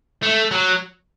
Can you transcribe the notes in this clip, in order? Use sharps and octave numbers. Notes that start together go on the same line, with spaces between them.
A3
F#3